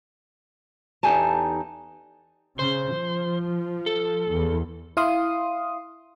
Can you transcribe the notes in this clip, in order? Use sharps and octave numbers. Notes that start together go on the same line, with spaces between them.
E2 D#4 G4 A4 G#5 A5
C#3 C5
F3
A4
E2
E4 F5 C6 D#6